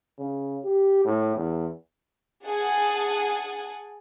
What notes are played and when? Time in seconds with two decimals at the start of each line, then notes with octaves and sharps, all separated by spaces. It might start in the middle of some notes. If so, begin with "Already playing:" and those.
0.19 C#3
0.64 G4
1.05 A2
1.35 E2
2.44 G#4 F#5 G#5 A5